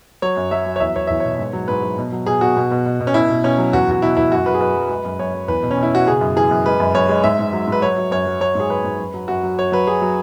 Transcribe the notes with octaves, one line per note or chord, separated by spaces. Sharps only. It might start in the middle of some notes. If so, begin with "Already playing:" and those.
F#3 C#5
F#2
F#3 E5
F#3
C#5
E2 E5
E2 C#5
E2 E5
B2 C#5
G#2
F#3
G#2 B4
F#3
B2
F#3
B2 G#4
B2 F#4
B2
B2
B2
B2
C#4
B2 E4
B2
B2 C#4
F#3
E2 F#4
E2 F#4
B2 E4
E2 E4
F#2 F#4
F#2 B4
G#4
F#2 B4
F#3
G#3
F#2
F#2 C#5
F#2
E2 B4
B2
C#4
B2
E4
B2 F#4
C#3 G#4
F#2
E3 G#4
F#2
G#3 B4
F#2
F#2 C#5
G#3
G#2 E5
G#2
F#3
G#2
B4
F#3 C#5
F#3
F#2 C#5
F#3
F#3 C#5
G#2 G#4
F#3 B4
G#2
F#2
F#3
F#2 F#4
F#3
F#2 C#5
F#3 B4
F#3 G#4
F#3